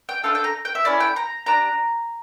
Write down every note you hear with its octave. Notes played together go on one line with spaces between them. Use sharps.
G5
A3 D4 A4 F5
G5
A#5
G5
E5
C#4 E4 A4 D5
G5
A#5
D4 G4 A#5